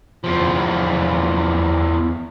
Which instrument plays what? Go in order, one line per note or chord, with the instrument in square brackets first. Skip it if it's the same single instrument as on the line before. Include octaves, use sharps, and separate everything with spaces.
[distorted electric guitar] E2 F3